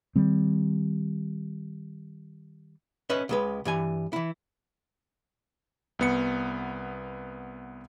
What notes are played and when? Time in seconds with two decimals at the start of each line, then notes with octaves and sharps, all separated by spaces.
0.16 D#3 G3 C4
3.10 C#4 B4 D#5 E5
3.29 C#2 G#3 B4
3.65 G2 E3 G#5
4.13 E3 E4
5.99 C2 B3 C#7